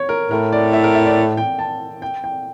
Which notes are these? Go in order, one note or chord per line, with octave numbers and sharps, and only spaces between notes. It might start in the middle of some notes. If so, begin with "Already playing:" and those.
Already playing: C#5
A#4
A2 A#4
D5
E5
A#4
E5
D5
G5
A5
G5
G5